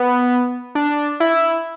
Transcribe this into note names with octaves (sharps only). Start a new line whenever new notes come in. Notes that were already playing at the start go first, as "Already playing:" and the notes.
Already playing: B3
D4
E4